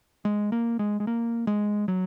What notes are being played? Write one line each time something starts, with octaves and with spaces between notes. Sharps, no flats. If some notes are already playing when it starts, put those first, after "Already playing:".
G#3
A#3
G#3
G#3
A#3
G#3
F#3